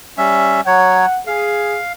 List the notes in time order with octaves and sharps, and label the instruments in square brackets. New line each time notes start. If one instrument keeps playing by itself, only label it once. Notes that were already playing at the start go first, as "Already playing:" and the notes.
[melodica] G3 C#4 E5
[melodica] F#3 C#5 [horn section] F#5
[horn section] G#4 [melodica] F5